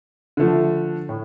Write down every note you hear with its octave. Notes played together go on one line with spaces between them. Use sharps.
D3 F3 A3
A2